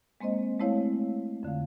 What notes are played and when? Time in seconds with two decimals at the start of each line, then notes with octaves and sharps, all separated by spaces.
0.21 G#3 A#3 C4 C5 D#5
0.60 G#3 A3 C4 E4 C#5 F5
1.43 F2 D3 A3 F5